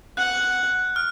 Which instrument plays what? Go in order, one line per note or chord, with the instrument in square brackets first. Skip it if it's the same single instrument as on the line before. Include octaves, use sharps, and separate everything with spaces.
[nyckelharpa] F#5 [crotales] F#6
[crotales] F6